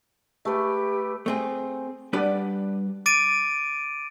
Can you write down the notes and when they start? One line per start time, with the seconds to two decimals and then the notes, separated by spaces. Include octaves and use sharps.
0.45 A3 G4 B4
1.26 A3 C4 G#4
2.13 G3 D4 G4 B4 D5 F#5
3.06 D6 A6 D7 D#7